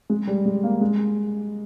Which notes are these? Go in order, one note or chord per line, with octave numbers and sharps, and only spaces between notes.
G#3
G3
G#3
A#3
G#3